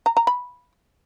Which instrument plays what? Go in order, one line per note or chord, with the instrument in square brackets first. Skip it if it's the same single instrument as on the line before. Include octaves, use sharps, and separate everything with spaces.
[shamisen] A#5
A#5
B5